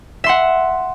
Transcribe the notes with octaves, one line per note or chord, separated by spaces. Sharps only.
E5 F#5 C6